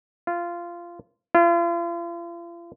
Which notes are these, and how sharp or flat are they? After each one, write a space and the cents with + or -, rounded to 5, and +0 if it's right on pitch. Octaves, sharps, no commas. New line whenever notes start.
F4 -15
F4 -40